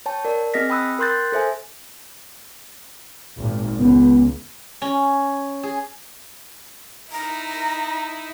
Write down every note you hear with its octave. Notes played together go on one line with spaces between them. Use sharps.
C#5 G5 A5
A#4 D5
C4 G#4 D#5 A#6 B6
G5 B5 D#6 E6 F#6
A#4 G5 C6 F#6 G6 A6
A4 C5 E5 G#5
G#1 A#2
C#2 B3
C#4
G#4
D#4 E4 A#5